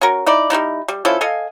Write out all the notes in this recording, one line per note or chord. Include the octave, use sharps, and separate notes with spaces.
C#4 F#4 A#4
D#4 E4 D5
G3 A#3 D#4 E4
G3
F3 C#4 E4 A4
A4 D#5 F5 G#5